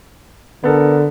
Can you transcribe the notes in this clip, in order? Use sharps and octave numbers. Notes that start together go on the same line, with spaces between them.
D3 B3 A4 A#4